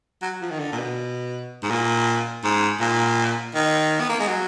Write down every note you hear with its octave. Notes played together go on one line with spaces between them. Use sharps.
F#3
F3
D#3
D3
A#2
B2
G#2
A#2
G#2
A#2
D#3
B3
A#3
G#3
F#3